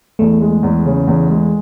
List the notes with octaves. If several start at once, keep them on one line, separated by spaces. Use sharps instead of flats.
E2 A3
G#3
E2
C#3
E2
G#3